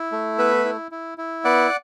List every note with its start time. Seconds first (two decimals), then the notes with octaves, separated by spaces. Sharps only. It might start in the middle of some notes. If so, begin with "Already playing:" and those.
Already playing: E4
0.12 A3
0.38 B3 B4 E5
0.65 E4
0.91 E4
1.18 E4
1.44 B3 D5 F#5